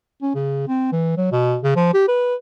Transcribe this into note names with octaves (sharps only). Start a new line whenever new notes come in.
C#4
C#3
C4
E3
F#3
B2
C#3
F3
G4
B4